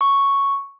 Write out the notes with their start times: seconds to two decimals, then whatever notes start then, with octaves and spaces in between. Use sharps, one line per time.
0.01 C#6